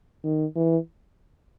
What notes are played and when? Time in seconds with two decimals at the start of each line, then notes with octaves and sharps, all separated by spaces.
0.24 D#3
0.56 E3